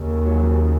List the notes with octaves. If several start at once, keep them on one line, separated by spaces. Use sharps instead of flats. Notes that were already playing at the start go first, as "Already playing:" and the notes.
Already playing: D#2 C#3
F#3